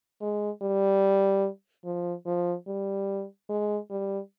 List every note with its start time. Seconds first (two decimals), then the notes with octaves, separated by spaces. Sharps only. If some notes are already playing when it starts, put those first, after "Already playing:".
0.22 G#3
0.62 G3
1.85 F3
2.26 F3
2.67 G3
3.49 G#3
3.90 G3